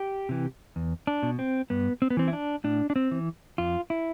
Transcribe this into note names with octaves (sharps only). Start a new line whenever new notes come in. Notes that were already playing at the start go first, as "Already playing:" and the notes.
Already playing: G4
C3 E3
E2
D4
B2
C4
G2 B3
C4
B3
E3 C4
E4
D4
A2 D4
D4
C4
E3
F2 F4
E4